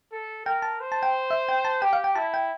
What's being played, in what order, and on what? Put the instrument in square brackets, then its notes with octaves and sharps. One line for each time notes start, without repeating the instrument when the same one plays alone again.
[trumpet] A4
[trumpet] A#4 [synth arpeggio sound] G5
[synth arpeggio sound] A5
[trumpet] C5
[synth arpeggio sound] A5
G5
E5
G5
A5
[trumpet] G4 [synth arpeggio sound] G5
[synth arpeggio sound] F5
G5
[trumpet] E4 [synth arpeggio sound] A5
[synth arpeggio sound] G5